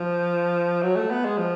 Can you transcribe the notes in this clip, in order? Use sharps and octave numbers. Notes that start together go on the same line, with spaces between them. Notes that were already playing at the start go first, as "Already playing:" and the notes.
Already playing: F3
F#3
A3
B3
G#3
F3